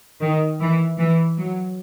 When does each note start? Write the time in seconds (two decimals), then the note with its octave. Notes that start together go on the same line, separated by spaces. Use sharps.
0.21 D#3
0.60 E3
0.98 E3
1.38 F#3